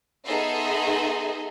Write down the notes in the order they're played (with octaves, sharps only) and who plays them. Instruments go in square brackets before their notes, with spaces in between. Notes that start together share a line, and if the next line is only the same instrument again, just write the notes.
[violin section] B3 D#4 G#4 A4 E5 C6